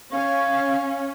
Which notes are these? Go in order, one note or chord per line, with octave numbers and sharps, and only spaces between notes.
C#4 C#5 F5